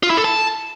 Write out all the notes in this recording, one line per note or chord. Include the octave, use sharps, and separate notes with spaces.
F4
E4
A4
A5